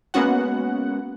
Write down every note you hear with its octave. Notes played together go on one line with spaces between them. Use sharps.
G#3 A#3 B3 C#4 F#4 F#5